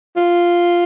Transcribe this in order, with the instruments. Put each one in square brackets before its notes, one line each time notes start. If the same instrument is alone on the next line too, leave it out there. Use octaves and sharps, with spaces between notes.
[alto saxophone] F4